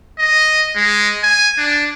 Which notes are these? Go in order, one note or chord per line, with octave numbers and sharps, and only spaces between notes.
D#5
G#3
G#5
D4